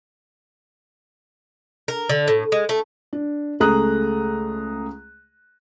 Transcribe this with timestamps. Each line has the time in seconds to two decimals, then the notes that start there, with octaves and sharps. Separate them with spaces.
1.88 A#4
2.10 D3
2.28 A2
2.52 G#3
2.69 A3
3.13 D4
3.60 C#2 A3 G#4 A#5 D#6 F#6